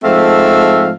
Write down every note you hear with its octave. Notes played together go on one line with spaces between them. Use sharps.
G#2 F3 A3 C4 E5 F5